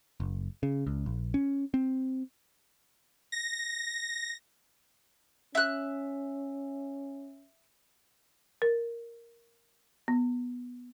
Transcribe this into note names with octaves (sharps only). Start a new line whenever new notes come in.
F#1
C#3
C#2
A#1
C#4
C4
A#6
C#4 E5 F#6
A#4
B3